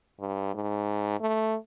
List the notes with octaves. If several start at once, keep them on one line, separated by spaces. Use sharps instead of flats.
G2
G#2
A3